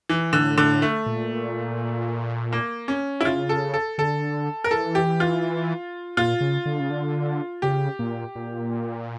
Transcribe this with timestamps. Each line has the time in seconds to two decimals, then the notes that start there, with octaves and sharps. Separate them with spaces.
0.09 E3
0.33 A2 D3
0.58 D3
0.82 A3
1.06 A#2
2.53 A#3
2.88 C#4
3.21 E4
3.25 C#3 F4
3.49 A4
3.74 A4
3.98 D3 A4
4.64 A#4
4.71 E3 A4
4.95 G4
5.20 F4
6.17 A#2 F4
6.41 C#3
6.66 D3
6.80 C#3
6.90 D3
7.62 C#3 G4
7.99 A#2
8.35 A#2